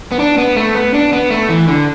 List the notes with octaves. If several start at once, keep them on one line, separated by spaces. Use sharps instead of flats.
B3
D4
B3
A3
B3
D4
B3
A3
E3
D3